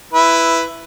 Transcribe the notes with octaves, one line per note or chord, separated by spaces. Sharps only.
E4 B4